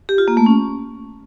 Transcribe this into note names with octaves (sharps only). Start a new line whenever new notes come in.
G4
F4
A#3
A3
C#4